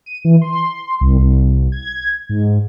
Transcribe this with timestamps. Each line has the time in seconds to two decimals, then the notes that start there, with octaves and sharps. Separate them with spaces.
0.06 D#7
0.25 E3
0.41 C6
1.01 C2
1.19 C2
1.72 G#6
2.29 G#2